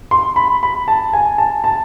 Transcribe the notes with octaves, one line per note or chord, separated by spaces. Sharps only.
C6
B5
B5
A5
G#5
A5
A5